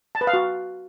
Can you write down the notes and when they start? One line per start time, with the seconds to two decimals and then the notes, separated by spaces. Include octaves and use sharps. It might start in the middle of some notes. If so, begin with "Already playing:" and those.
0.15 A5
0.21 B4
0.27 F5
0.33 F#4